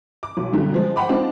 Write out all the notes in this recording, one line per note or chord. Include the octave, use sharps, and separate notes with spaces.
D6
B1
F#2 B2 D3 G3
F3 G#3
C5 F#5 G5 B5 D6
G#3 C4 D4 D#4 F4